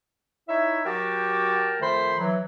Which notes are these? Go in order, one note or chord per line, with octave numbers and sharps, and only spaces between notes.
D#4 E4 C#5 E5
F#3 F#4 G4 A#4 G5 A5
F2 D#3 A3 C5 B5 C6
E3 F#3